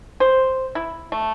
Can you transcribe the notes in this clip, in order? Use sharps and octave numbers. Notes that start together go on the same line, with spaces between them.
C5
E4
A3